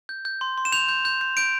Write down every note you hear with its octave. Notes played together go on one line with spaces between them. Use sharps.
G6
G6
C6
C6
E7
G6 F7
G6
G6
G6
G6 D7